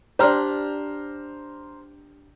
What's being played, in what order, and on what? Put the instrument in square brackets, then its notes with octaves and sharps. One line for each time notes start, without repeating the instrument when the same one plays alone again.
[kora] D4 G4 [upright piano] C5 A#5 F6